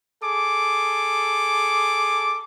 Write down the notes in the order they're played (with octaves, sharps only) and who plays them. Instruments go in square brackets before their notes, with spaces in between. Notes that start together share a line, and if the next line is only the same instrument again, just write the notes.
[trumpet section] G#4 A4 D6